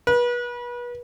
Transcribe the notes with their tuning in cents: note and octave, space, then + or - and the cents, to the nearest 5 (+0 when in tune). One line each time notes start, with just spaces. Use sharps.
B4 -30